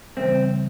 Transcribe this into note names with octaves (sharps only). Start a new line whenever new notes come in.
C#3 E3 G3 C4